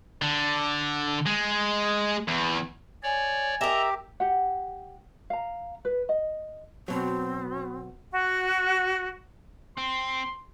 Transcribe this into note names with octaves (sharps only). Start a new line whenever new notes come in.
D3
G#3
E2
C#5 D5 G#5
G4 A#4 D#5 E5 A#5
G4 F#5
F5 A#5
B4
D#5
B2 F#3 C4
F#4
C4 C6